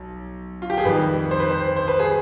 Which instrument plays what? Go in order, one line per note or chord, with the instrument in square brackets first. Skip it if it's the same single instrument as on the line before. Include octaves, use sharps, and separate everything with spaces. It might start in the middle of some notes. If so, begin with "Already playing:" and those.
Already playing: [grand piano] B1
F4
G4
G#4
F2 D#3 G3 B4
C5
B4
C5
C5
B4
G#4